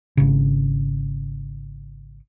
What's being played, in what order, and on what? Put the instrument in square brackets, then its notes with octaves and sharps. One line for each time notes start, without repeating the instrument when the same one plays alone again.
[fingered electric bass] G#1 C#3